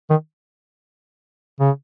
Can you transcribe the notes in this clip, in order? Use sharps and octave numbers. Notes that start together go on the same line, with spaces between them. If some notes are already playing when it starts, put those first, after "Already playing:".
D#3
C#3